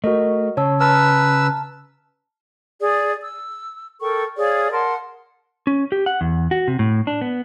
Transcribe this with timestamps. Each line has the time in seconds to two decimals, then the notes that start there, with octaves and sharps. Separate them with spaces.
0.04 A3 F#4 A#4 D#5
0.57 C#3 C#5 A5 E6
0.80 B4 A5 A#5 E6 F6
2.80 G#4 D5
3.22 E6
4.01 A4 A#4 G5 C#6
4.37 G#4 C#5 D5 F5
4.72 A#4 F#5 A5 C6
5.67 C#4
5.92 G4
6.06 F#5
6.21 E2
6.51 F#4
6.68 C3
6.79 A2
7.07 D4
7.21 B3